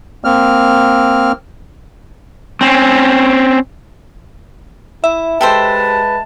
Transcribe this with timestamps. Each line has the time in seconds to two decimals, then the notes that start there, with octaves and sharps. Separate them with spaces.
0.24 A#3 C4 F6
2.61 C4 C#4
5.04 E4 E5
5.41 G#3 G4 A4 B4 C5 A5